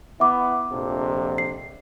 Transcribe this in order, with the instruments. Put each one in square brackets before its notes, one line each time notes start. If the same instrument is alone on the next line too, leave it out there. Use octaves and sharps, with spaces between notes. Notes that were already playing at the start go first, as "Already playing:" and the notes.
[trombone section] B3 E4 [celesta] E5 D6
[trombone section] A#1 F2 C3
[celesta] C7